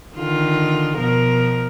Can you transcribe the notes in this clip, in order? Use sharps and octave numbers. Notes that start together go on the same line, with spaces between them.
D3 D#3 F4
B2 F3 A#4